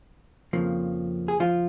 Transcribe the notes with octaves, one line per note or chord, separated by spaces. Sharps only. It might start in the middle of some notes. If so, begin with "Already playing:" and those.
F2 C#3 F3 A#3
G#4
F3 F4